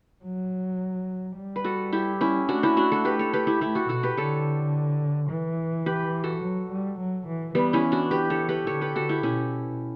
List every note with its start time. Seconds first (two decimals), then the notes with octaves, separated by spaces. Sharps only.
0.24 F#3
1.36 G3
1.56 B4
1.64 F#4 A4
1.92 E4 G4
2.21 C#4 E4
2.48 A3 D4 F#4
2.63 C#4 E4
2.77 D4 F#4
2.92 F#4 A4
3.05 G4 B4
3.19 A4 C#5
3.33 G4 B4
3.47 E4 G4
3.61 A3 E4 G4
3.75 F#4 A4
3.89 B2 F#4 A4
4.03 G4 B4
4.17 D3 A4 C#5
5.30 E3
5.86 G4 B4
6.24 F#4 A4
6.42 F#3
6.70 G3
6.99 F#3
7.27 E3
7.55 E3 G3 B3
7.73 C#4 E4
7.92 D4 F#4
8.11 G4 B4
8.30 A4 C#5
8.49 G4 B4
8.67 D3 A4 C#5
8.81 G4 B4
8.95 D3 F#4 A4
9.09 E4 G4
9.23 B2 C#4 E4